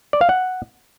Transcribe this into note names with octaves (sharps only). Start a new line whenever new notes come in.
D5
F5
F#5